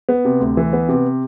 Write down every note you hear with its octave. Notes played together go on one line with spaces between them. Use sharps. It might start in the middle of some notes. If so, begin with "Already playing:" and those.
B3
C3
D2
E3
B3
C3